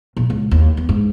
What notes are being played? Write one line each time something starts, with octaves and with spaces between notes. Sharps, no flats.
A#1
C#2
D#2
E2
G#2